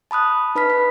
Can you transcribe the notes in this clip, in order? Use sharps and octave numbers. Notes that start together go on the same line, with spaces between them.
A5 B5 D#6 F#6
D#4 B4 B5 F6 B6
B4